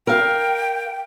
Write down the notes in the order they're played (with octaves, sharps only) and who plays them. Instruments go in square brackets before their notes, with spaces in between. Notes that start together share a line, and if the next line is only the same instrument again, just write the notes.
[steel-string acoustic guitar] A#4 F5 [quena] G5